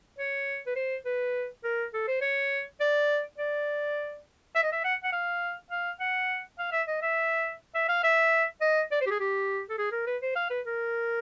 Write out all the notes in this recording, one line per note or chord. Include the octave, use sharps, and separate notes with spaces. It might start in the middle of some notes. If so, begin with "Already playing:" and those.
C#5
B4
C5
B4
A#4
A4
C5
C#5
D5
D5
E5
D#5
E5
F#5
F#5
F5
F5
F#5
F5
E5
D#5
E5
E5
F5
E5
D#5
D5
C5
G4
G#4
G4
A4
G#4
A#4
B4
C5
F5
B4
A#4